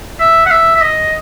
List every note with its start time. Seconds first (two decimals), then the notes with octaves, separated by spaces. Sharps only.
0.20 E5
0.46 F#5
0.51 E5
0.76 E5
0.81 D#5